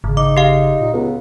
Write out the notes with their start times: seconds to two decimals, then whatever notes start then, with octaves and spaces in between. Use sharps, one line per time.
0.04 G#1 C#3
0.17 D#4 D6
0.37 G4 F5
0.80 A#2
0.93 C#2 B3